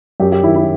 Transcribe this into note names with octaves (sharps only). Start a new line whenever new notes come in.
F#2 G4
G4
D#3 E4
E4